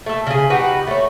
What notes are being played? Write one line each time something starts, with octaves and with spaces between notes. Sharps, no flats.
A3 A4
C#3 G#4
D#4 F#4 G4 B4
A3 C#5